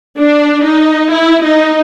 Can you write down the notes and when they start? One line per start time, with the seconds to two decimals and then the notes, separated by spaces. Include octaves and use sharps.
0.19 D4
0.65 D#4
1.13 E4
1.43 D#4